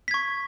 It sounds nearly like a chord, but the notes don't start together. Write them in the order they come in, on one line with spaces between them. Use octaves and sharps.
B6 G#6 C#6